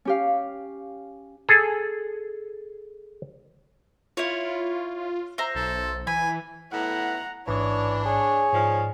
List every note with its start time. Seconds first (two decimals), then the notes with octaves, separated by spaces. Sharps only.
0.05 C#4 G4 F5
1.49 G#4 A4
4.17 E4 F4 C#5
5.38 C5 E5 A#5
5.55 B1 A4
6.07 E3 G#5 B5
6.72 A2 B3 E4 F#5 A#5
7.48 A1 G#2 E3 D4 C#5 D#6
8.06 G#4 C#5
8.53 G#2 D#3 F3 D5 F6